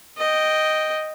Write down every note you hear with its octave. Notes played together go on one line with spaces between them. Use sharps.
D#5 G5